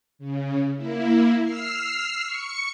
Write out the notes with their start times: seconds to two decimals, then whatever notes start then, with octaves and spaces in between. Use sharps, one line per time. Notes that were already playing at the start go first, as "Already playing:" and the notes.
0.19 C#3
0.76 A#3 E4
1.42 E6 F6 C7
2.26 C#6 C#7